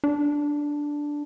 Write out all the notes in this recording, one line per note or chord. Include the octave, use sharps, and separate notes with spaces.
D4